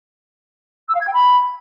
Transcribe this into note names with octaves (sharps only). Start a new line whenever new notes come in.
E6
F5
G#6
G5
B5